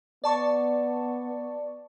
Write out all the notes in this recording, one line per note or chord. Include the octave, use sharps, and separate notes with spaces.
B3 D5 A5 C#6